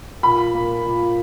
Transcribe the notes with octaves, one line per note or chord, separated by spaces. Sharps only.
A#2 B5
A#3
A#2